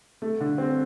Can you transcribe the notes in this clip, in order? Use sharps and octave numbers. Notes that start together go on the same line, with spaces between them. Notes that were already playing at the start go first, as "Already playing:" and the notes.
A3
D3
C4